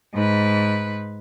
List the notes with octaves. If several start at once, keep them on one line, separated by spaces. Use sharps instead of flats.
G#2 B4